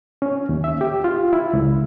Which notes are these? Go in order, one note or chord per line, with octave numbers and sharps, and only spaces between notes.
C#4
D#2
E5
G4
F4
E4
C#2